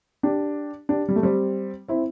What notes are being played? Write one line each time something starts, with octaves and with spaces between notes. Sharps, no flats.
D4 G4
D4 G4
G3
A3
G3 C4
C4 E4